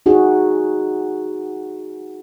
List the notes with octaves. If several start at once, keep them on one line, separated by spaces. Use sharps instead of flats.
D#4 F#4 G#4